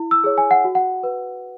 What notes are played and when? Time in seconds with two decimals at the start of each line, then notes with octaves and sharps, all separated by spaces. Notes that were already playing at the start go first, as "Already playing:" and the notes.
Already playing: E4
0.11 E6
0.24 G#4 C#5
0.38 G#5
0.51 F#5
0.64 F#4
0.75 F#5
1.03 B4